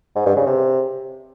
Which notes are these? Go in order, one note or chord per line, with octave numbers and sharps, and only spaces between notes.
G#2
G2
C#3
C3